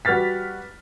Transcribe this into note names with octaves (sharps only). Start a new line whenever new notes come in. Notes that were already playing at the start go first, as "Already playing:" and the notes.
G3 F#4 B4 F6 A6 B6